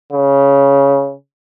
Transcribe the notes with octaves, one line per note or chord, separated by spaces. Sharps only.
C#3